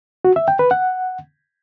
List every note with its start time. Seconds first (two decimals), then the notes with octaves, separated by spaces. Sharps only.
0.25 F#4
0.36 E5
0.48 G5
0.59 B4
0.71 F#5